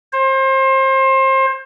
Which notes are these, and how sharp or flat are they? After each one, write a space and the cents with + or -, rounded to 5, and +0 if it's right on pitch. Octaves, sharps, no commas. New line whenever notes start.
C5 +30